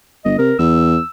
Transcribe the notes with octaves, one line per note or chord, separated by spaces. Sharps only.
G1 D#5
C3 A#4
E2 E6